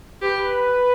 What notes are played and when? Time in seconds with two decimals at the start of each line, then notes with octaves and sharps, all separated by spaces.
0.22 G4 B4